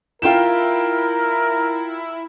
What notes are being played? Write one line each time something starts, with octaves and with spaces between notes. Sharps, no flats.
E4 F4 A#4 G5 E7